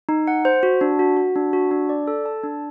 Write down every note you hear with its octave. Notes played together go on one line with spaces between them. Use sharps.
D#4
F#5
C5
F#4
D4
F#4
F#4
D4
F#4
D4
D5
A4
A5
D4